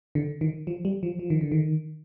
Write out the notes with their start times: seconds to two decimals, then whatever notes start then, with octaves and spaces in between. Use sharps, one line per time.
0.15 D3
0.41 D#3
0.67 F3
0.85 G3
1.03 F3
1.19 F3
1.30 D#3
1.41 D3
1.52 D#3